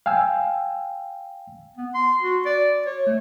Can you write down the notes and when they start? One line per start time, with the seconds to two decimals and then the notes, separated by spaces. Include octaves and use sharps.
0.06 F5 G5 G#5 E6
1.77 B3
1.94 C6
2.22 F#4
2.46 D5
2.86 C#5
3.07 A3